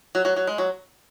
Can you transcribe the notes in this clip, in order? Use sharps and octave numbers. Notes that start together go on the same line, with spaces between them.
F#3
F#3
F#3
G#3
F#3